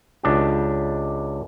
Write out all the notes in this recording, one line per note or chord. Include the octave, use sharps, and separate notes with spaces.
C#2 D4 G4